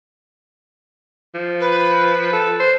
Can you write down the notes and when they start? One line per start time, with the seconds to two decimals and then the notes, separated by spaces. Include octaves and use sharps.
1.35 F3
1.60 B4
2.33 A4
2.60 C5